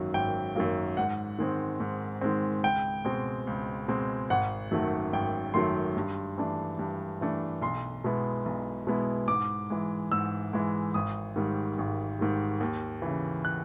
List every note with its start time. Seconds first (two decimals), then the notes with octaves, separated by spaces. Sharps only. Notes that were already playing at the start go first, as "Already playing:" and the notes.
Already playing: G#1 F#2 D#3 F#3 A#3
0.14 G#1 G5
0.56 F#2 D#3 F#3 A#3
0.97 G#2 F#5
1.39 D#3 G#3 C4
1.80 G#2
2.21 D#3 G#3 C4
2.63 C#2 G5
3.05 B2 G#3 C4
3.47 C#2
3.88 B2 G#3 C4
4.30 G#1 F#5
4.71 F#2 D#3 F#3 A3
5.13 G#1 G5
5.54 F#2 D#3 F#3 A3 C6
5.97 G2
6.38 E3 A3 D4
6.79 G2
7.21 E3 A3 D4
7.62 B1 C6
8.04 B2 G#3 B3 E4
8.46 B1
8.87 B2 G#3 B3 E4
9.28 G#2 D6
9.70 E3 G#3
10.12 G#2 E6
10.53 E3 G#3
10.94 G#1 D#6
11.36 G#2 D#3 G3
11.78 G#1
12.19 G#2 D#3 G3
12.60 D#2
13.02 C#3 E3
13.45 F#6